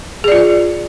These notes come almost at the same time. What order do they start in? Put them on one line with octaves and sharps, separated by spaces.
G#4 D5 F4